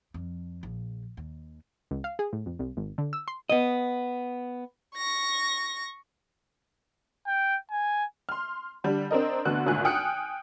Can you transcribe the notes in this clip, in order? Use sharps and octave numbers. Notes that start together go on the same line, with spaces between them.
F2
A#1
D#2
C#2
F5
G#4
A2
F2
C2
G#1
D3
E6
C6
B3 D#5
C#6 A#6
G5
G#5
C6 F6
D3 G3 D4
C4 D4 A#4 D#5
D2 D3 B3 F#6
G#1 D2 A#2 G#5 F#6
G5 G#5 D#6 F6 F#6 C#7